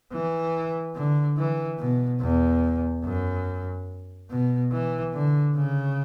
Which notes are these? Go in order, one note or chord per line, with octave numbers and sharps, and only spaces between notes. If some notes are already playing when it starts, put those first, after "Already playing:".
E3
D3
E3
B2
E2
F#2
B2
E3
D3
C#3